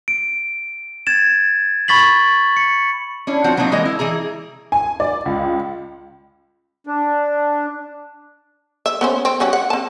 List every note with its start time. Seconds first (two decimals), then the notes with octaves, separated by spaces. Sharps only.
0.08 D7
1.07 G#6 A6 E7
1.88 B5 C#6 A6 B6 F#7
2.57 C#7
3.27 C#4 D4 E4
3.44 F3 C4 F#4 C5 F#5
3.57 F#3 A#3 C4 D4 D#4
3.72 E3 G#3 A#4 D#5
3.85 E4
3.99 E3 E4 G#4 A#5
4.72 G#5
5.00 D5
5.26 C#2
6.87 D4
8.86 E5
9.01 B3 C#4 C5
9.25 C4
9.40 G3 C#4 F#4
9.53 F#5
9.70 C4 A5